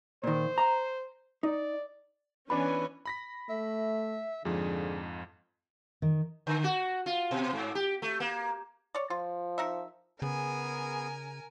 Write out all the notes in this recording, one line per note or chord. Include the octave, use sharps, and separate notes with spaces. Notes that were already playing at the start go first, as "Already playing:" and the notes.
A#2 D#3 C5
A#5
D#4 D5
E3 B3 C#4 D4 G#5 B5
B5 A#6 B6
A3 E5
F2 G#2 D3 F3 G#4
D#3
D3
F#4
F4
B2
G#2
G4
A3
A#3
C#5 D5
F3 F4
D#4 A#4 E5
C#3 B3 G#4 A#4 G#5